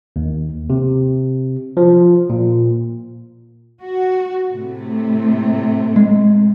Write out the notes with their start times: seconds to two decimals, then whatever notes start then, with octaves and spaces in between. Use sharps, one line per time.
0.16 D#2
0.70 C3
1.77 F3
2.30 A#2
3.81 F#4
4.51 A2 C3 A3
5.96 G#3